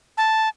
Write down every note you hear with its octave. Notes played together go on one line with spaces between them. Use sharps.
A5